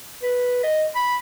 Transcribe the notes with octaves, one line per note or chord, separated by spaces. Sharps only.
B4
D#5
B5